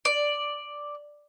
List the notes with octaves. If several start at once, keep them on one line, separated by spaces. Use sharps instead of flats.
D5